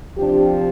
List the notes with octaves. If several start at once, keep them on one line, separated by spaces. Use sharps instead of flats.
C3 F3 D4 G4